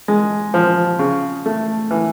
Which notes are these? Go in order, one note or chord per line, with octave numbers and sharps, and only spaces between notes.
G#3
F3
C#3
A3
E3